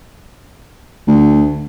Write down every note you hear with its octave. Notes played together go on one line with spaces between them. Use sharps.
D2